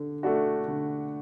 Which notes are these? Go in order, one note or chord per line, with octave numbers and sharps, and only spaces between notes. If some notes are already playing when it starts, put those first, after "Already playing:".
Already playing: D3 D4
A3 D4 F#4
D3